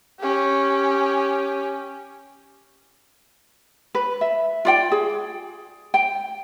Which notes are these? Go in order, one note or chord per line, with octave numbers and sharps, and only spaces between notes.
C#4 G4
B4
E5
F4 D5 G5
G#4
G5